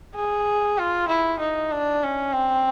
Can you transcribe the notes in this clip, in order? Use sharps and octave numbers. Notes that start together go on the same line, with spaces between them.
G#4
F4
E4
D#4
D4
C#4
C4